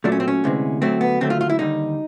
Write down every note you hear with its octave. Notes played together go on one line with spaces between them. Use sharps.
A#2 F#3 A3 D4
C#4
C4
C#4
D2 C3 E3 G#3
D2 D3 F#3 A3 C4
B3
D#2 D3 F#3 A3 C4
F4
F4
E4
D#2 D3 G3 D#4